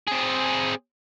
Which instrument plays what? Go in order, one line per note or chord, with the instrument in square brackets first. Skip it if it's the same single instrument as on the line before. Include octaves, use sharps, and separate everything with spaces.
[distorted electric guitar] C4 G#4